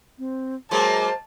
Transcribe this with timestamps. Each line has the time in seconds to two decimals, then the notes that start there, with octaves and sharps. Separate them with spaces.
0.19 C4
0.71 F#3 G#3 A#3 C5 A5